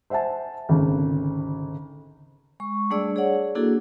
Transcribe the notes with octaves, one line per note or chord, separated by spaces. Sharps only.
C5 E5 F#5 G#5 A5
G#1 D2 C#3
G#3 C#6
G3 A3 D4 G#4 D5 E6
G#4 C#5 D5 F#5
A#3 D4 E4 F#4 G#4 A4